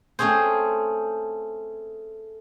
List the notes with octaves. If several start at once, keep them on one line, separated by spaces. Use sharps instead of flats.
A3 C4 C#4 G#4 C5